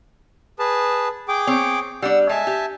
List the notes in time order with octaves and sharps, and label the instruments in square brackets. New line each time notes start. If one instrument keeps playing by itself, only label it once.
[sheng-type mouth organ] G#4 B4 A5
G#4 G5 D6
[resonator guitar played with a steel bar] C4 C#5
[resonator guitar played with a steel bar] G3 D4 [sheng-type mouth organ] F#5 E6
[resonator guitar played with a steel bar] G#3 [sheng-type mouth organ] E5 G#5 A5
[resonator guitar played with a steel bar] G4